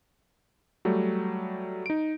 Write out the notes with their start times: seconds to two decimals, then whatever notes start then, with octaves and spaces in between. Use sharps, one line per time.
0.85 F#3 G3 A3
1.86 D#4 D7